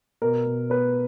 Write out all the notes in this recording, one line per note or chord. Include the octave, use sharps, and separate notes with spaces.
B2 A#4
B2
B3 B4